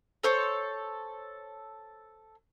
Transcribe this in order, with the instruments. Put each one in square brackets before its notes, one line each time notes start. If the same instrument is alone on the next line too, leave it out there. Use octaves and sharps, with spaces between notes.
[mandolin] A4 C5 C#5